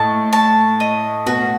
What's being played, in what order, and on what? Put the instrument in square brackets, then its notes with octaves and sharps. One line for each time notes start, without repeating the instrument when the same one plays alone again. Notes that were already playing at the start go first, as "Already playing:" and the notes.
Already playing: [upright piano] A2 [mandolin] D#5 A5
[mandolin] A5
D#5
[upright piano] B2 [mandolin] F#4